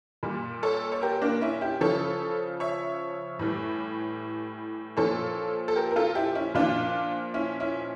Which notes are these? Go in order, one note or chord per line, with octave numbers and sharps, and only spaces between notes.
A#2 G3
A4 C#5
C#5
G4 A#4
A#3 D4
C#4 E4
E4 G4
C#3 F3 A4 C#5
C#5 E5
A2 E3 G3
A#2 F3 A4 C#5
A4
G4 A#4
A#4
F4 A4
E4 G4
C#4 E4
A#2 F3 D4 F4
C#4 E4
C#4 E4